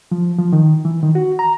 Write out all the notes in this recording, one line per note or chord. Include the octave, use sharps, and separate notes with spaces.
F3
F3
D#3
E3
D#3
F#4
A#5